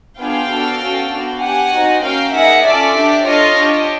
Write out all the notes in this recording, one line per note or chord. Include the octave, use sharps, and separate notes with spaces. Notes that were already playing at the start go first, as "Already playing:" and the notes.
B3 D4 F4 G#4 F5 G5
B3 D4 F#4 A4
C#4 F#4 A4
B3 D4 F#4
D4 G4 F#5 G#5
C4 D#4 F#4
A#3 C#4 F#4 F5 G5
A#3 D#4 G#4 E5 F#5
C#4 F4 A4 D5 E5
D4 G4
D4 F4 A4 C#5 D#5
D4 G4